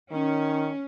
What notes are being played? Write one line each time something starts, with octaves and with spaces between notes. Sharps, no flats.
D#3 C#4